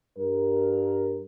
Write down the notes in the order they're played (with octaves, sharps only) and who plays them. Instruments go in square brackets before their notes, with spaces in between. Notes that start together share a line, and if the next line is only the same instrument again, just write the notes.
[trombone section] G2 A#4